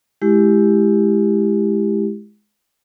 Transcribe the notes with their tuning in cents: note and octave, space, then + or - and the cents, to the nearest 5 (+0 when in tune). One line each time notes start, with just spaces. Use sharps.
G#3 +20 E4 +0 G4 +5